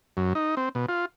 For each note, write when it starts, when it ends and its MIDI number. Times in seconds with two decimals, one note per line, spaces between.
0.17 0.33 42
0.35 0.55 63
0.57 0.69 60
0.75 0.86 47
0.89 1.05 65